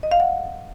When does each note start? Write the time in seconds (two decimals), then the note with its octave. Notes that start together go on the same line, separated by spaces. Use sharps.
0.03 D#5
0.11 F5
0.20 F#5